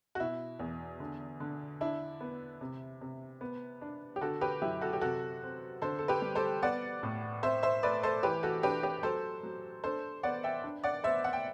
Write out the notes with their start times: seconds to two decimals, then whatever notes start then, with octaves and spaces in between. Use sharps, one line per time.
0.15 F#4
0.20 B2 E4
0.59 E2
1.00 D3
1.40 D3
1.81 D4 E4
2.21 B3
2.61 C3
3.01 C3
3.41 B3
3.81 D4
4.16 G4
4.21 D3 F#4 A4
4.41 G4 B4
4.62 F#2 E4 G4
4.81 F#4 A4
4.93 G4
5.01 C3 F#4 A4
5.42 C4
5.82 D3 A4 C5
5.99 A4
6.08 G4 B4
6.22 G3
6.35 A4 C5
6.62 B3 D5 F#5
7.03 A2
7.43 C4 C5 E5
7.63 C5 E5
7.83 A3 B4 D5
8.03 A4 C5
8.23 E3 G4 B4
8.43 F#4 A4
8.63 D4 G4 B4
8.83 G4 B4
9.03 F#3 A4 C5
9.43 F#3
9.84 D4 A4 C5
10.23 B3 D5 F#5
10.44 E5 G5
10.63 D4
10.83 D5 F#5
11.04 B3 C5 E5
11.24 F#5
11.33 G5